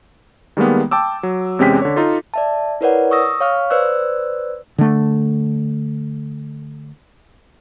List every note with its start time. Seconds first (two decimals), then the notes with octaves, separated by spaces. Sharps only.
0.57 D#3 G3 G#3 A#3 B3
0.91 G5 A5 D6 E6
1.23 F#3
1.59 E2 C3 G#3 C#4 G5 B6
1.82 D3 C#5
1.96 D#4 F4 A4
2.34 D5 E5 A5
2.81 E4 A#4 B4 C#5 D5 F#5
3.11 C#6 D#6 E6 A#6
3.40 C#5 F5 C#6 F6
3.70 B4 C5 D5 E6 F#6
4.78 D3 A3